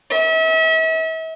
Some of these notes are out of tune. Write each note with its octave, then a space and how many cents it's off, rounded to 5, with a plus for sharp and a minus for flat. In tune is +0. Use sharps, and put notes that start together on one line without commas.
E5 -40